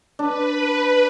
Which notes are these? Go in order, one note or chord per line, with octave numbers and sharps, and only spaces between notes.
D4 B4